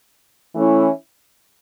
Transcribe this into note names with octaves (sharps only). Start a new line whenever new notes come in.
E3 A3 C#4 E4